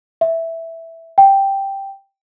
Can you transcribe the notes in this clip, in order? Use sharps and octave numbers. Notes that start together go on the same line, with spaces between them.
E5
G5